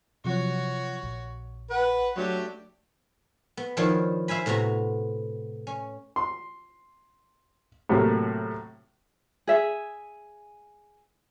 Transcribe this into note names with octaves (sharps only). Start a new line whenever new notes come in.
C3 F3 F#3 F#4 C#5
A#1
B4 F#5
F#3 A3 D4 G4
B3
D#3 F3 D4 E4 C5 C#5
C5 E5 F5 G#5 B5
A2 C3 B3 F#4 A#5
C#4
C6
A2 C3 F#3 A3 A#3
G#4 E5